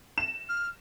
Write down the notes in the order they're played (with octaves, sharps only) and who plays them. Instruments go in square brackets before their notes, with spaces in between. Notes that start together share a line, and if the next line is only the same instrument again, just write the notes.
[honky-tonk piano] E7
[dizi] F6